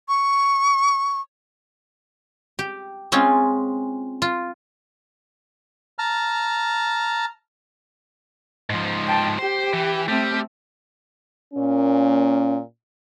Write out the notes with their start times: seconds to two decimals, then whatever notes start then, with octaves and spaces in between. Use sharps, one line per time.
0.09 C#6
2.59 G4
3.12 G#3 C4 C#4 F4
4.22 F4
5.99 A5 A#5 F6
8.70 G#2 F3
9.07 G5 A5
9.38 G4 C5
9.73 E3
10.09 G3 A3 C4
11.54 A#2 A#3 C#4